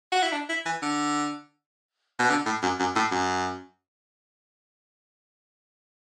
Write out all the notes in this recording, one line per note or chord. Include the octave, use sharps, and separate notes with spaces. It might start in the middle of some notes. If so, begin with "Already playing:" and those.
F#4
E4
D4
E4
E3
D3
B2
D3
A2
F#2
F#2
A2
F#2